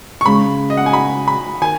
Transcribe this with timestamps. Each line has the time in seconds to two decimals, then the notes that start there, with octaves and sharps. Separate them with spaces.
0.21 C#6
0.26 C#3 G#3 C#4 B5
0.70 D#5
0.77 F#5
0.86 G#5
0.93 B5
1.28 B5
1.61 D#3 G#5